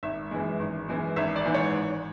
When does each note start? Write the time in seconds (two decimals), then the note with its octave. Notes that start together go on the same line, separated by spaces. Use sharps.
0.03 G#1 E5
0.31 F#2 E3 G#3
0.60 G#1
0.88 F#2 E3 G#3
1.16 G#1 E5
1.36 D5
1.45 G#2 E3
1.54 C#5
1.73 G#1